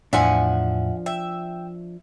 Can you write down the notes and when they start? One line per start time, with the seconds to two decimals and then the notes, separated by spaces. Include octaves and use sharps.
0.13 E2 A2 F3 D4 E5 F#5 G#5
1.06 E5 G5